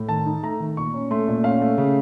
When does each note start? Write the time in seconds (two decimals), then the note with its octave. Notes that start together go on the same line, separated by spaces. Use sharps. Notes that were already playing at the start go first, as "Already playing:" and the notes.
Already playing: A2
0.09 D#3 A5
0.26 D#4
0.43 A3 A#5
0.60 D#3
0.77 A#2 C#6
0.94 C#4
1.11 A3 C6
1.28 A#2
1.44 C#4 F5
1.61 A3
1.78 C#3